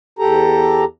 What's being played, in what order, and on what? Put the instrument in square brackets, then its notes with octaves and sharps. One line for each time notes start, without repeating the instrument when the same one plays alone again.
[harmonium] E2 G4 A4 A#5